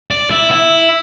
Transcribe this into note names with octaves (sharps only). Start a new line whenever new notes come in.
D5
E4
E4